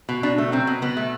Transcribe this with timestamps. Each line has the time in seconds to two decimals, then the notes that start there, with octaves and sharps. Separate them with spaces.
0.09 B2
0.23 B2 D4
0.38 A3
0.52 F#3 C4
0.67 B2
0.82 B2 B3
0.97 A3